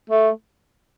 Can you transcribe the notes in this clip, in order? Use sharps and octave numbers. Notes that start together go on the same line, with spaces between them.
A3